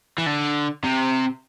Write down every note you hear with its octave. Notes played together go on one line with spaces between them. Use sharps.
E3
D3
C3